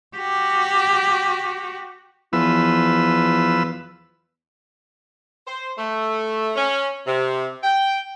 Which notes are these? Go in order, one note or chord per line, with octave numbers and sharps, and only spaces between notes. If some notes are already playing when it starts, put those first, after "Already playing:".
F#4 G4
E2 F3 B4 E6
C5
A3
C#4
C3
G5